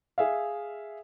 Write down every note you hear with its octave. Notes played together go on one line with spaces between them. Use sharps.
G#4 E5 F5